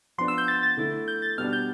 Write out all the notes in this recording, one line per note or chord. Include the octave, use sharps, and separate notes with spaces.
F3 B3 D4 C6
E6
G6
A6
A6
D3 A3 E4
G6
A6
B2 G3 B3 D4 F6
G6